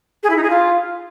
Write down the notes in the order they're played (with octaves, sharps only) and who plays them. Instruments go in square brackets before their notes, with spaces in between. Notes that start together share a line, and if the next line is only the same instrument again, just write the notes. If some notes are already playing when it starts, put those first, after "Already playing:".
[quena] G#4
E4
D#4
G#4
F4